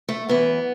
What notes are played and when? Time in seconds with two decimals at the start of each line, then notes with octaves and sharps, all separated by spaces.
0.09 A3
0.29 F#2 E3 B3